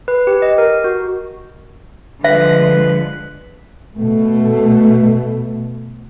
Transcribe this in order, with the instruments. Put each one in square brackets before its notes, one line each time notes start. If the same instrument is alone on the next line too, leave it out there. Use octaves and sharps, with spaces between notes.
[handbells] B4
G4
D#5
A#4
F#4
[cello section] D3 F3 G#3 [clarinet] B4 [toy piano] E5
[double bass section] B2 A3